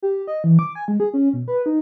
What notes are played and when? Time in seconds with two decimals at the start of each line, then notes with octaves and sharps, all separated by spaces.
0.03 G4
0.27 D#5
0.44 E3
0.59 D6
0.75 G#5
0.88 G#3
1.00 G#4
1.14 C#4
1.33 B2
1.48 B4
1.66 D#4